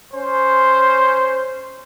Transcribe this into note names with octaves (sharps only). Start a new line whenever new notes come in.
C#4 C5